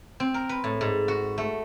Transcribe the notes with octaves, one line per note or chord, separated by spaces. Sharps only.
C4
A#4
B4
A2
G#2
F#4
A3